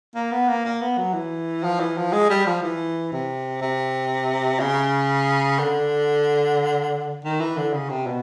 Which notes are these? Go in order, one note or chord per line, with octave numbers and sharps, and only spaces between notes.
A#3
B3
A#3
A#3
B3
F#3
E3
F3
E3
F3
G#3
G3
F3
E3
C3
C3
C#3
D3
D#3
E3
D3
C#3
C3
B2